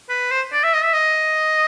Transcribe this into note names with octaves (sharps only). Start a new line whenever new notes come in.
B4
C5
D5
E5
D#5
E5
D#5